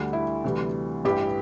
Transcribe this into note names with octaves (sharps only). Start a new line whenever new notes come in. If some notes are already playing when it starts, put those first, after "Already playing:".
Already playing: D2 D3 G3
E4
D2 C3 E3 G3
A1 G2 E3 G4